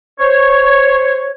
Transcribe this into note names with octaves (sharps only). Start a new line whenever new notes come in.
C5 C#5